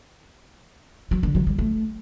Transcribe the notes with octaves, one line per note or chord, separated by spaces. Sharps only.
F#3
D3
F#3
G3
A3